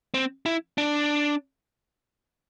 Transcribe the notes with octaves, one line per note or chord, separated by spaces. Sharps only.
C4
E4
D4